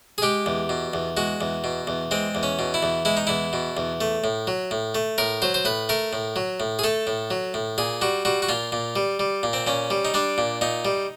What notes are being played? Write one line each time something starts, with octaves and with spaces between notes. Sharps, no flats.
G#4
G#3 G4
E2
B2
E2
G#3 F#4
E2
B2
E2
G#3 C4
E2
C#4
B2
E4
E2
G#3 E4
D#4
E2 E4
B2
E2
A3
A2
F#3
A2
A3
A2 A#4
F#3 C5
C5
A2 B4
A3 A#4
A2
F#3
A2
G#4
A3 A4
A2
F#3
A2
A#2 G#4
G3 F#4
G3 F#4
F#4
A#2 F4
A#2
G3
G3
A#2
C4
A#2 C#4
G3
D#4
G3 D4
A#2
A#2 D#4
G3